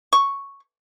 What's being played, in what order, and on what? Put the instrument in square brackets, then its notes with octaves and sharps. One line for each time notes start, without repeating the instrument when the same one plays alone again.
[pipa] C#6